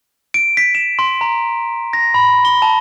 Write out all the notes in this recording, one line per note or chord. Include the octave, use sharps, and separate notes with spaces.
D7
B6
E7
C6
A#5
A#6
B5
G7
A5